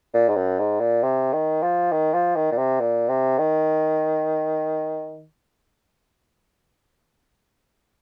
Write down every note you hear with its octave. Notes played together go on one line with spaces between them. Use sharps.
A#2
G#2
F#2
G#2
A#2
C3
D#3
F3
D#3
F3
D#3
A#2
C3
A#2
C3
D#3